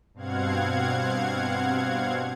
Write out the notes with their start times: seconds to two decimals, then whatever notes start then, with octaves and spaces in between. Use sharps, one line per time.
0.14 G2 B2 C4 F5 F#5 G#6